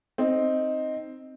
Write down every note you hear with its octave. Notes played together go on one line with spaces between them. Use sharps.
C4 D#4